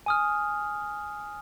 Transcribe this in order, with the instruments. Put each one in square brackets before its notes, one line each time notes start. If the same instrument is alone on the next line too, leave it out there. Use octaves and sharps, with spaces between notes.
[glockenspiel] G#5 D#6 F6